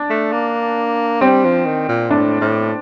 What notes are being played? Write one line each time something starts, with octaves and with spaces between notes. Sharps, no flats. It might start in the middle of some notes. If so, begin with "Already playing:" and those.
Already playing: D4
A3
A#3
G3 C4
F3
D#3
A#2
A2 D4
A2